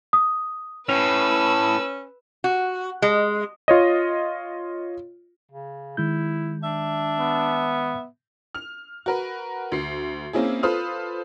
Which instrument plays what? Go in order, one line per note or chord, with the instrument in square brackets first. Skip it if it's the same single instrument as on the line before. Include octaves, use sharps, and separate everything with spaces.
[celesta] D#6
[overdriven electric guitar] A2 [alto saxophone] C#4 [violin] B4 E6 [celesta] F7
[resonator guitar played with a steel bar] F#4
G#3
[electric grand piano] F4 C#5 D#5
[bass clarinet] C#3
[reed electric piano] D#3 G#3 G6 [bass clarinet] E4
[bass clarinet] D4 [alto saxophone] E5
[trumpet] B3
[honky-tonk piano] F6 F7
F#4 A#4 B4
D2 C7
A#3 C4 C#4 E4 G#4
F4 A4 B4 C5 D#6 F6